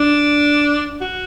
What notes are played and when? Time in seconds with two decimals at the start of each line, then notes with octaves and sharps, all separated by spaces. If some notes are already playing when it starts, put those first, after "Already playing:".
Already playing: D4
1.01 F#4